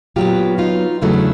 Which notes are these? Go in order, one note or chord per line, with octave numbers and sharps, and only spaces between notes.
A#2 F#3 B3 F4 G4
D#4 F4
E2 C#3 F#3 A3 D4 E4